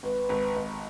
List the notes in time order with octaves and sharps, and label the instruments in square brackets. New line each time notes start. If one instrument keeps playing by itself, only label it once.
[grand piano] G#1 [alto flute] B4
[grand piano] G#1
G#1